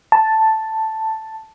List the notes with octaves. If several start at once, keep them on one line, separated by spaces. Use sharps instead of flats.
A5